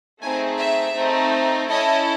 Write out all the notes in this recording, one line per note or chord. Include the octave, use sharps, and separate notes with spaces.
A3 C4 D#4 G#4 G#5
E5
A3 C4 D#4
C#4 E4 A4 D#5